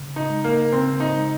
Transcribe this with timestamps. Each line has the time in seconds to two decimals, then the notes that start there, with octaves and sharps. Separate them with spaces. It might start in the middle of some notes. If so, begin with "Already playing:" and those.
Already playing: C#3
0.16 D#4
0.30 G#3
0.44 A#3
0.72 C#3 C4
1.00 D#4
1.14 G#3